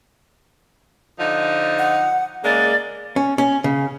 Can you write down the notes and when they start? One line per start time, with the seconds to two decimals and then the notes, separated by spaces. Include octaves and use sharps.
1.19 D3 F3 D#4
1.78 F#5
2.44 C#3 G#3 A#3 D5
3.16 C#4
3.38 C#4
3.64 C#3